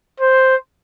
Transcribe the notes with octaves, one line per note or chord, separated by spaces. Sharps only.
C5